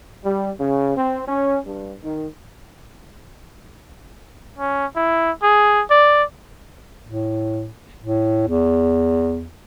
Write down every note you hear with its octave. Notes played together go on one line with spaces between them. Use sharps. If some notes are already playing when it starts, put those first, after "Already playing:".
G3
C#3
C4
C#4
G2
D#3
C#4
E4
G#4
D5
A2
A2
E2